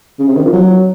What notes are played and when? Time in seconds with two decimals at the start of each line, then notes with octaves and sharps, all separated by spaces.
0.19 C#3
0.27 C3
0.35 D#3
0.44 F3
0.53 F#3